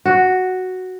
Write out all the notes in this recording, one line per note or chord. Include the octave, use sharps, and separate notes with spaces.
F#4